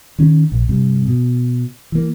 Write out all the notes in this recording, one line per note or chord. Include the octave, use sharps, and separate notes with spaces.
D#3 C#4
A#1
G2 C3
B2
E3 A#3